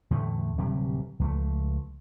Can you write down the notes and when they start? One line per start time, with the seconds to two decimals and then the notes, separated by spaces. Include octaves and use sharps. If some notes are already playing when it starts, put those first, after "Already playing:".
0.11 E2 A2 D3 A3
0.58 D1 C3 F#3 G3
1.19 C#2 F3 A3